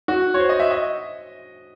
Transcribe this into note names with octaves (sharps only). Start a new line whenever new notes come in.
F#4
C#5
C5
D#5
E5
D#5